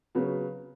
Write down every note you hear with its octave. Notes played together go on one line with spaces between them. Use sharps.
C#3 F#3 B3